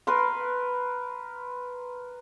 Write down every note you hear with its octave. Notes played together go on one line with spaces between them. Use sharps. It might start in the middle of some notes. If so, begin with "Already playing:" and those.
A#4 B4 C6